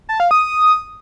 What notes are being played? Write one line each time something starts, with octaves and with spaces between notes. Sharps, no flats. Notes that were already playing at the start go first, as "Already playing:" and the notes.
A5
F5
D#6